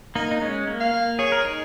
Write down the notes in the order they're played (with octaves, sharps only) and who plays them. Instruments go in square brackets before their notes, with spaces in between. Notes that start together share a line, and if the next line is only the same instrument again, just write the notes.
[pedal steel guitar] A#3 D#4 [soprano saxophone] D#5
[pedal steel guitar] D#4
G#3 C#4
A#3
[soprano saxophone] F5
[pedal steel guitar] A#3
[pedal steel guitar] G#4 [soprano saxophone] C#5
[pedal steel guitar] A#4
D#4 G#4